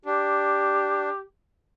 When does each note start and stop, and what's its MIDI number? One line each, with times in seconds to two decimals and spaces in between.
0.05 1.09 62
0.05 1.23 67